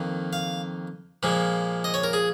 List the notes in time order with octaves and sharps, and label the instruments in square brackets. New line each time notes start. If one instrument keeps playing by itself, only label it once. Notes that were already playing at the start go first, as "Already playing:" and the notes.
Already playing: [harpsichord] F2 D#3 A#3
F5
A#2 F3 G#3
D#5
C#5
A#4
G#4